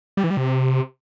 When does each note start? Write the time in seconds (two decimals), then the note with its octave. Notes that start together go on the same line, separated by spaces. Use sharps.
0.17 G3
0.24 E3
0.30 G3
0.37 C3